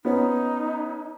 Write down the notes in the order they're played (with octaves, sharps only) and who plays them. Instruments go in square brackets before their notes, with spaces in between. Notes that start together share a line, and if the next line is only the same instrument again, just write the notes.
[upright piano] B3 C#4 [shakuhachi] D#4